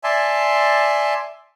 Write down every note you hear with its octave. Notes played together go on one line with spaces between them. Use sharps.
D5 E5 G#5 A5 C6